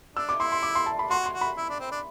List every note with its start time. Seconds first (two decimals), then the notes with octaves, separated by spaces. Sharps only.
0.16 D4 E6
0.29 D6
0.40 E4 C6
0.52 C6
0.63 D6
0.75 C6
0.86 A5
0.99 B5
1.10 F#4 C6
1.26 C6
1.33 F#4
1.41 B5
1.57 E4
1.69 D4
1.80 C4
1.92 D4